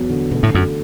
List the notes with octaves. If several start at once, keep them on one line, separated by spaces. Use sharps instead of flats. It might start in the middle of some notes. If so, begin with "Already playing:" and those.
Already playing: E2 F#3 B3
D3
B2 A3
A2
F#2 F#4